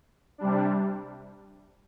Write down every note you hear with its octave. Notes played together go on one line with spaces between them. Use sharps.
C3 G3 D4